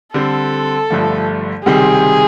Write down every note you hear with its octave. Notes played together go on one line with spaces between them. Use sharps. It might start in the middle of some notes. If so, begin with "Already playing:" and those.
D3 G3 C4 A4
G1 G2 D3 F3 A3
C#2 C3 D#3 G3 C4 G#4